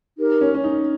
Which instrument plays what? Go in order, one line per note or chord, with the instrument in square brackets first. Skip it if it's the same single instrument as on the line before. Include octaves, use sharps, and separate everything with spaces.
[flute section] D#4 G4 A#4
[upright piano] C#4
C#4
D#4